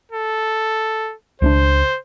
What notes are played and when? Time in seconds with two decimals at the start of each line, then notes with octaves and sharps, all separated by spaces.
0.12 A4
1.42 C#2 C#4 D4 C5